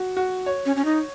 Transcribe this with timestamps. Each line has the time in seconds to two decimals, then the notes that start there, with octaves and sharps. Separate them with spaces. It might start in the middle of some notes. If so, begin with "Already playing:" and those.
Already playing: F#4
0.17 F#4
0.46 C#5
0.66 C#4
0.76 C#4
0.85 D#4